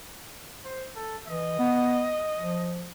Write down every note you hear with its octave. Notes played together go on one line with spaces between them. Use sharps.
C5
A4
E3 D#5
B3
F3